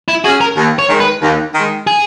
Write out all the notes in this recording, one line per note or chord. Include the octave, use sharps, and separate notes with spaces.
E4
C#4 F#4 G#4
A#4
D#2
C#5
D#3 G#3
B4
D#2
D#3 G#3
G#4